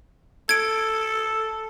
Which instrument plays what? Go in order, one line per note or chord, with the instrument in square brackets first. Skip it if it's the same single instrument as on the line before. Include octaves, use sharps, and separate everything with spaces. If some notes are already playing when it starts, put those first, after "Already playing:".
[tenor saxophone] A4 [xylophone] G#6 D7